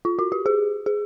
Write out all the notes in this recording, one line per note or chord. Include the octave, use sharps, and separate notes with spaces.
F4
F#4
G4
G#4
G#4